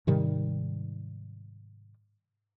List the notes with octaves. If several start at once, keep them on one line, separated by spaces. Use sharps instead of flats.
G#2 C3 D#3 G3